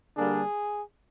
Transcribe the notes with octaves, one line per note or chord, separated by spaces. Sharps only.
D3 G3 A#3 D4 G#4